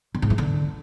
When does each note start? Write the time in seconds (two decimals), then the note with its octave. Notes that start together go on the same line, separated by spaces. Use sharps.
0.15 D3
0.22 G#2
0.30 E3
0.38 D3